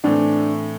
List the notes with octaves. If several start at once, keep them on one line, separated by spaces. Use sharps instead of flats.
A2 E3 A3 C4 D4